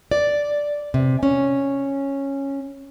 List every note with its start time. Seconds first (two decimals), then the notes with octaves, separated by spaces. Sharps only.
0.11 D5
0.94 C3
1.23 C#4